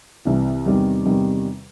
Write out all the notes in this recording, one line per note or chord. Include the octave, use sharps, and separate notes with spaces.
C2 C3 E3
E2 C3 D#3 G3
E2 C3 D#3 G3